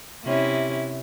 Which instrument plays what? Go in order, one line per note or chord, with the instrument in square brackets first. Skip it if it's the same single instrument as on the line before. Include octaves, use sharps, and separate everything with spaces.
[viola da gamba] C3 C#4 E4